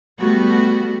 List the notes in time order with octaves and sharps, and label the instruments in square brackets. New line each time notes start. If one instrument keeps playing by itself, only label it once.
[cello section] G3 A3 B3 F#4